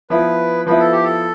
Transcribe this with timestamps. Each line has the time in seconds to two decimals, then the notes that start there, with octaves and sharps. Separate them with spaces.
0.10 F3 B3 E4 B4
0.67 F3 B3 E4 B4
0.80 A4
0.92 G4
1.04 A4